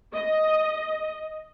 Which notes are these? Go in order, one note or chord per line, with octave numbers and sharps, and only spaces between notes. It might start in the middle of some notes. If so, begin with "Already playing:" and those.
D#5